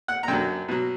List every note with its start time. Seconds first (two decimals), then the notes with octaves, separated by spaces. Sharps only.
0.08 F#5
0.23 A#5
0.28 F#2 D3 F#3 G5
0.68 B2 F#3